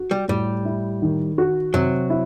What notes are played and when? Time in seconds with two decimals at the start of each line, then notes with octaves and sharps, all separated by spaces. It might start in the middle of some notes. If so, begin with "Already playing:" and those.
Already playing: F#4
0.11 G3
0.28 A2 G3
0.65 E4
1.02 D#3
1.38 F#4
1.74 C3 F#3
2.10 E4